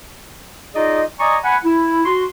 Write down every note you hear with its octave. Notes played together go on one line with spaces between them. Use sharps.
D#4 F4 G#4 D5 D#5
D5 D#5 G#5 A#5 C#6 D#6
F#5 G#5 B5
E4
F#4 C6